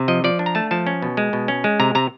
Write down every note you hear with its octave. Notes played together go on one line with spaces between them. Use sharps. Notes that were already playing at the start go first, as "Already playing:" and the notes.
Already playing: C3
F3 D#5
F3 D5
D4
A#5
A3 A5
F3 A5
C#4
B2
G#3
B2
C#4
G#3
C3 A#5
C3 A#5